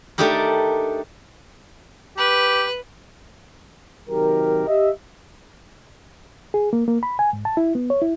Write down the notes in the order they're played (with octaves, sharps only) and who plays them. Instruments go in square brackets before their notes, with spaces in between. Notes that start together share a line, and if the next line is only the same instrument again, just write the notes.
[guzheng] A3 D4 D#4 G4 A#4
[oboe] G4 [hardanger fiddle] B4
[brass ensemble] C3 D#3 F#3 G4 A#4
G4 D#5 E5
[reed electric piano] G#4
A#3
A#3
B5
G#5
G#2
A5
E4
B3
C#5
E4